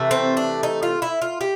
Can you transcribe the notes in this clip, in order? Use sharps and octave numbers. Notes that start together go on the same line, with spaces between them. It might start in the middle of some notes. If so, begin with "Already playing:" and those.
Already playing: C3 E3 A3
C4
D4
D#4
F4
E4
F4
G4